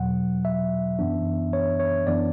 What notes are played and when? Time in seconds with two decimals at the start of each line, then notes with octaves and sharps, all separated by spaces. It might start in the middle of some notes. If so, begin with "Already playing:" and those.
Already playing: E2 B2 F#3 F#5
0.45 E5
0.99 F#2 E3 B3 D4
1.53 C#5
1.80 C#5
2.07 F#2 E3 B3 D4 D5